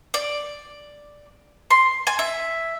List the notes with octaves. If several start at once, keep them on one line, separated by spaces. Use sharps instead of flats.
D5
C6
G#5
E5